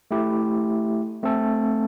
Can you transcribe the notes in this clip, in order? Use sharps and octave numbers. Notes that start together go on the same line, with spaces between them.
A3 E4 G4
A3 C4 A4